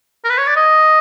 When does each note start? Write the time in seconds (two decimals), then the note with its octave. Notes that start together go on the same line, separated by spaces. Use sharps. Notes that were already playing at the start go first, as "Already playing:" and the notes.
0.24 A#4
0.30 B4
0.38 C#5
0.47 D5
0.56 D#5